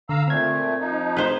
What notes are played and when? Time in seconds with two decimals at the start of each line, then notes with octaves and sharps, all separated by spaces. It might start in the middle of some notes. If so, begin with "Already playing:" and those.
0.09 D3 F5 A#5 E6
0.28 A#2 A3 C4 G#6
0.80 F3 D#4
1.17 B4 C5